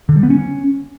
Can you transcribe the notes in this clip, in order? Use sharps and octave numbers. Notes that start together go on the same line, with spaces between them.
D3
G3
B3
C#4